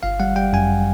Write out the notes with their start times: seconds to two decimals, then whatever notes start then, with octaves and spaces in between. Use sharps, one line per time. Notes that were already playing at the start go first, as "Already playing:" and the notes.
0.03 G1 F5
0.20 G3 F#5
0.36 G3 G5
0.53 F#2 G#5